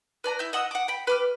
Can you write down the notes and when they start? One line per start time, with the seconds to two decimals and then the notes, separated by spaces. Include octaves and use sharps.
0.24 B4 D5 A5 A#5
0.39 E4 G6
0.53 D#5 F#5 D#6 E6
0.71 F#5 D6
0.88 G5 B5
1.07 B4 D6 F6